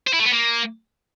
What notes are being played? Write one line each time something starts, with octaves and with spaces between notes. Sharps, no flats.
C5
E4
A3
B3
A#3